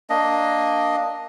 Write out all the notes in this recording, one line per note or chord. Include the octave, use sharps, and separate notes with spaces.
A#3 D4 D#5